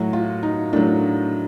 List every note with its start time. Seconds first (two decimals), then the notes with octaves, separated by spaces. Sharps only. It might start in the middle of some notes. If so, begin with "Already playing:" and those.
Already playing: A2 F#3 F#4
0.13 F4
0.43 D#4
0.73 A2 F#3 D4